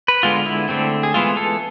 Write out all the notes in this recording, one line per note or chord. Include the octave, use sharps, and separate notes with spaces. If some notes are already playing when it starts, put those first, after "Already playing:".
B4
D3 G#3 B3 F4
E4
D3 A3 C4
G#4
E3 G#3 B3 F4
A4